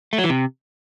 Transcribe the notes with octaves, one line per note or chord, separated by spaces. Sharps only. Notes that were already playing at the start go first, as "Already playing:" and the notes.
A3
F#3
E3
C3